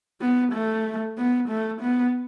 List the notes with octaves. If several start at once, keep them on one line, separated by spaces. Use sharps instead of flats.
B3
A3
B3
A3
B3